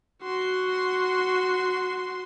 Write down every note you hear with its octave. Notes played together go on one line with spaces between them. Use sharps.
F#4 C6